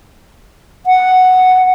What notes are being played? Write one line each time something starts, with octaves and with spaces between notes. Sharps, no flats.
F#5